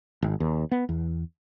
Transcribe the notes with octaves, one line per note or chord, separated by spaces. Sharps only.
G#1
D#2
B3
E2